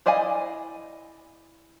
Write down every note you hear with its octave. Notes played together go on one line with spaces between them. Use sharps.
E4 D5 D#5 F5 G#5